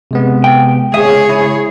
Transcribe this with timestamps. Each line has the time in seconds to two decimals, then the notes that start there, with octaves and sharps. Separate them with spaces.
0.11 C3 G#3 B3
0.44 G5
0.94 C#2 G#4 C#5 E5 D#6
1.29 E4